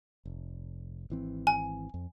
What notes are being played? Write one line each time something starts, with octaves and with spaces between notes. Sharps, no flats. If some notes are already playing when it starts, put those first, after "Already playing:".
F1
G#1 E3 C4
G#5
F2